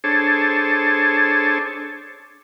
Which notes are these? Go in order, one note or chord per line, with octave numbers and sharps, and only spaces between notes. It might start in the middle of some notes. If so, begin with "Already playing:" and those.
D4 G#4 A4 C5 C#5 A5